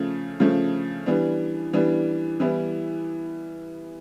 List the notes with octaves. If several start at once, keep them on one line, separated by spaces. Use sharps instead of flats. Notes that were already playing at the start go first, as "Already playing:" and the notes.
Already playing: C#3 F3 A3
C#3 F3 A3
E3 G3 B3 D4
E3 G3 B3 D4
E3 G3 B3 E4